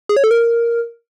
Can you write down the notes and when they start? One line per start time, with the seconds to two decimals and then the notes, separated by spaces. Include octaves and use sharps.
0.09 G#4
0.17 C#5
0.24 A4
0.31 A#4